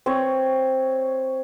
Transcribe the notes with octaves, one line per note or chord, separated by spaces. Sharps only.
C4 C#5